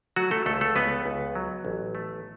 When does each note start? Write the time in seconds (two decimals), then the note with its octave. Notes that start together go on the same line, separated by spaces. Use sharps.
0.16 F#3 A3 F#4
0.31 A3 A4
0.46 C#2 A3 A4
0.61 A3 A4
0.76 C#2 B3 B4
1.06 C#2
1.35 F#3
1.65 A1
1.95 A3